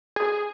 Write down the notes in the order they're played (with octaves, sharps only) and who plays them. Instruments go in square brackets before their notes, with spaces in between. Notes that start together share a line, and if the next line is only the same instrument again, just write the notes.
[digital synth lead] G#4